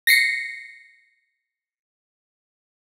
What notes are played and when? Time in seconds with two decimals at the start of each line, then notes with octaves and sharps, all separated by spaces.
0.07 A#6 C7 C#7